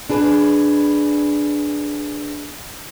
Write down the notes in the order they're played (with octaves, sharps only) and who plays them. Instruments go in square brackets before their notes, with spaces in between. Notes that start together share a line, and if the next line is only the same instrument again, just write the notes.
[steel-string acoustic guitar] D4 G#4 B4